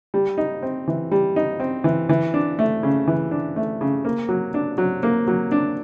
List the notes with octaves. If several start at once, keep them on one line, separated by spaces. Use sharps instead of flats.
G3
D#4
C4
E3
G3
D#4
C4
E3
E3
D4
A3
C#3
E3
D4
A3
C#3
A#3
F#3
D4
F#3
A#3
F#3
D4